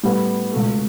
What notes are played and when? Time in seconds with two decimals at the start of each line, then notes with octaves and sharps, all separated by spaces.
0.03 A2 G3 B3
0.51 C#2 B2 A3